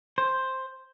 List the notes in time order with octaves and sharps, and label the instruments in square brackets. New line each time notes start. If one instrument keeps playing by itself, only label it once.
[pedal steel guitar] C5